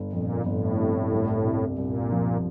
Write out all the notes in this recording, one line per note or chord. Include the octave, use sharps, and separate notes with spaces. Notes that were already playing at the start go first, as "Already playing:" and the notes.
Already playing: G1
F2 A#2
G1 A2
C3
C2
C3
C2 A#2
F3